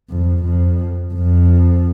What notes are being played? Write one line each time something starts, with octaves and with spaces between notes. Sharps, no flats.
F2
F2
F2